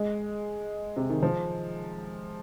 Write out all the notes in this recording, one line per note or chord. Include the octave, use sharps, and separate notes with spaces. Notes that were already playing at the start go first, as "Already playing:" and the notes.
Already playing: G#3
C3
D#3
F3